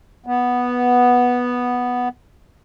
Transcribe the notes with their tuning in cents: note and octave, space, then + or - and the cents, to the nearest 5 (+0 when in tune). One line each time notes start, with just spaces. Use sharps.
B3 -5